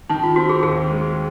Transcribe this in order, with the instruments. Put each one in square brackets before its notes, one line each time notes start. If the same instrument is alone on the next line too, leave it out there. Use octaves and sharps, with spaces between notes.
[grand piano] D#3 [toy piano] D#4
[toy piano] F4
[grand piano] C4 [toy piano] F#4
[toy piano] G#4
[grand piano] D#2 [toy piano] G#4
[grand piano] G#3